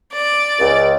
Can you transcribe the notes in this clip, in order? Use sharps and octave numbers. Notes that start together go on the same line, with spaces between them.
D5
C#2